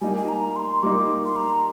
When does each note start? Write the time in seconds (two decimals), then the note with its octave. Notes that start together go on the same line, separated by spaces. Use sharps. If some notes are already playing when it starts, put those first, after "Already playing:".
0.01 G3 A#3 D#4 G#5
0.17 G#5
0.28 A#5
0.56 C6
0.83 G3 A#3 D#4 D6
1.25 C6
1.36 A#5